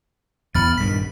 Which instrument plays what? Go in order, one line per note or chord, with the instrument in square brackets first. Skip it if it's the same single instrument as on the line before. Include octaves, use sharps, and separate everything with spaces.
[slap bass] E2 B3 [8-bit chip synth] B5 F6 A6
[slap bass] A#1 G2 D#3 [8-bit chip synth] B6